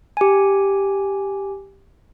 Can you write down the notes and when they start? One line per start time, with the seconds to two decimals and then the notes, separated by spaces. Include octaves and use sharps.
0.17 G4 G#5